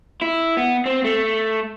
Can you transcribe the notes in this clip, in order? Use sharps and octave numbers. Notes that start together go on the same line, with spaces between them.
E4
B3
C4
A3